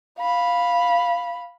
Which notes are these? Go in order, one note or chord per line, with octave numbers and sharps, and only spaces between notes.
F5 B5